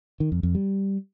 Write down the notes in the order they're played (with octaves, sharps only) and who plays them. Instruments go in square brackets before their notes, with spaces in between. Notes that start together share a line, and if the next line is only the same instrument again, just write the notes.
[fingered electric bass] D#3
F2
F2
G3